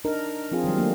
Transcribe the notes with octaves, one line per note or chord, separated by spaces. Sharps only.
D4 D#4 A#4
F3 C4 F4 G#4
D#3 F#3 G3
F#3 A3 A#3 D4